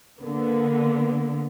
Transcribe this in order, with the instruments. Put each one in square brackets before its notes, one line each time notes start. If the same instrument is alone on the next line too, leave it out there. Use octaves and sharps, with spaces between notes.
[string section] D3 A#3 B3